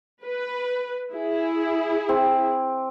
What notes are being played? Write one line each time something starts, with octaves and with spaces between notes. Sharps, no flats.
B4
E4 G#4
C4